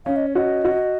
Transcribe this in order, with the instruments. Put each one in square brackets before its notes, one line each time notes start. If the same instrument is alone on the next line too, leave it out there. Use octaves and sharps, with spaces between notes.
[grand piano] C#4 [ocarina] F5
[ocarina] D#5
C#5
[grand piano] F#4 [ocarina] D#5
[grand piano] F#4